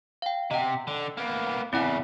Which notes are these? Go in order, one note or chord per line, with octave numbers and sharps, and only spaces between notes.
F5 G5
C3 D#5 F#5
D3
A#3 B3
E2 C#3 C4 E4 F#5